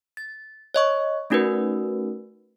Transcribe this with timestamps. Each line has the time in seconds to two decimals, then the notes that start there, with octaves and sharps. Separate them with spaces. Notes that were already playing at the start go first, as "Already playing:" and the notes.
0.17 A6
0.74 C#5 D#5 C#6
1.30 A3 C#4 D#4 F#4 A#4 B4